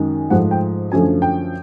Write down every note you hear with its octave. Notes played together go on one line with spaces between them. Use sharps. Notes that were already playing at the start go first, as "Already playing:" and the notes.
Already playing: F#2 D#3 G#3
G#2 F3 A3 F#5
G5
F#2 D3 F3 A3 G#5
G5